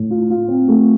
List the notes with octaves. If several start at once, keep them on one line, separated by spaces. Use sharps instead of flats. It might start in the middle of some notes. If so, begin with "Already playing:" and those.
Already playing: A2
F4
F4
C4
A3